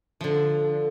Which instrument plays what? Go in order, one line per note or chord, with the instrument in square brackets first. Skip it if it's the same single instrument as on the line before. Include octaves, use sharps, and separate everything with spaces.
[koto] D3 F3